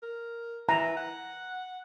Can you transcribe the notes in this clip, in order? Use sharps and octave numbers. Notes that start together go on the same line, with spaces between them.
A#4
E3 A#5
F#5